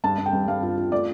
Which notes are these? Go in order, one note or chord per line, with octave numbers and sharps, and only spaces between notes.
G2 A5
G2
G5
G2
G2 F5
F4
F4
A3 D5